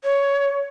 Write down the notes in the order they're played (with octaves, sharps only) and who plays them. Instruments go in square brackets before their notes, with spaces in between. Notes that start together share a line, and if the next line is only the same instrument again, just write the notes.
[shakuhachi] C#5